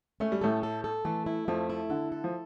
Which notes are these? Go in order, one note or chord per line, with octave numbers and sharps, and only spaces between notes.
A3 C#4
G3
A2 A3 A4
A4
A4
E3 A3
E4
F2 F3 A3
E4
D3 A4
A4
F3